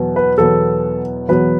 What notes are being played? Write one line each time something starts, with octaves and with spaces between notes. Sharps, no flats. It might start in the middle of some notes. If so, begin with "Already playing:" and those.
Already playing: E2 B2 F#3 B3
B4
E2 B2 F#3 B3 A4
E2 B2 F#3 B3 B4